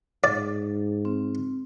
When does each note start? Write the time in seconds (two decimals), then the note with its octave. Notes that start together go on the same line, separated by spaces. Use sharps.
0.24 G#2 D5
1.05 C4